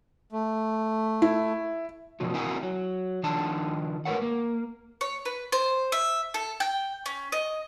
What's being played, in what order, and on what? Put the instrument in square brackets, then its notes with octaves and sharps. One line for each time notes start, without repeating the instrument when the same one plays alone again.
[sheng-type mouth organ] A3
[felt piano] E4
[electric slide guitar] F#2 B2 F3 F#3
C4 E4 F#4 A#4 E5 G#5
F#3
D#3 F3 D4 A5
G#2 A#4 B4 C#5 F#5
A#3
[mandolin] C#5
B4
C5
E5
A4
G5
C#4
D#5